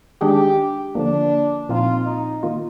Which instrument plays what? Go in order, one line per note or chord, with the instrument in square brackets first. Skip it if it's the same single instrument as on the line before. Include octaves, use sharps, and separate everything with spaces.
[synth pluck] D#3 G#3 D4 G#4 [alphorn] G4
[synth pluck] D3 F3 A#3 [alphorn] D4
[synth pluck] A#2 F3 C4 D#4 [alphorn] F4
[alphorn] D#4
[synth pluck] D#3 A#3 F4